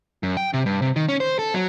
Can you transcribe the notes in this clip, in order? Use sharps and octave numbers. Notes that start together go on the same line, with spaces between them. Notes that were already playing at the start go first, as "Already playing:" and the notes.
F#2
G5
C3
G2
C3
D#3
C#4
C5
A4
F#3